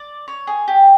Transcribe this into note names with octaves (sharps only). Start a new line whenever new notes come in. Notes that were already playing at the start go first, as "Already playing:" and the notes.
Already playing: D5
C#5
G#4
G4